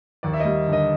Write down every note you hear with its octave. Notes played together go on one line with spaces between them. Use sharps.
D#2 D5
E5
G3 D#5
D3
D#5